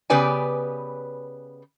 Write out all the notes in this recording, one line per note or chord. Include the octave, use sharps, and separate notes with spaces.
C#3 B3 G4 B4 D5 G#5